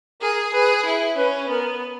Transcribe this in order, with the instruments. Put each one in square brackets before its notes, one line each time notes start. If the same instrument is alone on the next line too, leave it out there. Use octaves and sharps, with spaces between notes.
[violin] G#4 [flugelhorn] A#4
[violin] G#4 [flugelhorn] B4
[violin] E4
[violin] C#4 [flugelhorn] B4
[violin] B3 [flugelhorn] A#4